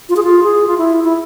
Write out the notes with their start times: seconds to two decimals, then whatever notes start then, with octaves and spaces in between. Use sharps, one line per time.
0.09 F4
0.16 G#4
0.23 F4
0.43 G#4
0.67 F4
0.78 E4
1.04 E4